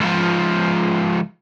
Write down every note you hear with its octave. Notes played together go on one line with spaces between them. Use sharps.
C#2 F3